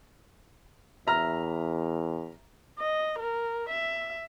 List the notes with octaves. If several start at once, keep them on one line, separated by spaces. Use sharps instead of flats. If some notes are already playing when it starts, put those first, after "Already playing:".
E2 E5 A#5 F6
D#5
A#4
E5